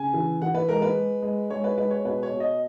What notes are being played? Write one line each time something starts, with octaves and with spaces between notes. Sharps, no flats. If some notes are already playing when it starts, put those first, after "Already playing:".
Already playing: C#3 G#5
E3
E3 F#5
B4
G#3 A#4
B4
G#3
G#3
G#3 C#5
B4
G#3 B4
C#5
B2 B4
C#5
B2
D#5